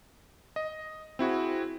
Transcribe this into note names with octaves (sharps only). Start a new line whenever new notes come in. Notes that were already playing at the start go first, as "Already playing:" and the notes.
D#5
C4 E4 F#4 G#4